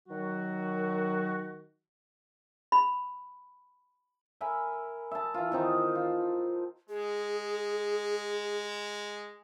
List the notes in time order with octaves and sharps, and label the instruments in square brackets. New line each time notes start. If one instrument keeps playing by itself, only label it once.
[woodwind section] D#3 F#3 F#4
[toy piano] B5
[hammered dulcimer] A#4 E5 G#5 B5
E5 A5
E3 F4
D#3 C4 D#4
F4
[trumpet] G#3 [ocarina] G#4